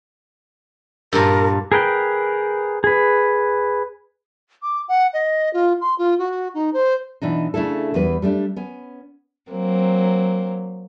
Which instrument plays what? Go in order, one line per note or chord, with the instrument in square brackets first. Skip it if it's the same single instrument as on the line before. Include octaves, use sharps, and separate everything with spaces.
[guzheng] G2 A#2 [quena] A#4
[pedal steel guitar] G#4 A#4 B4 G5
G#4 B4
[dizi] D6
F#5
D#5
F4
C6
F4
F#4
D#4
C5
[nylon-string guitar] B2 E3 D4 D#4
C#3 A3 D4 E4 A4
E2 E3 G3 B3 B4
G3 A3 C4 D4
B3 C#4
[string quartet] F#3 A#3 C4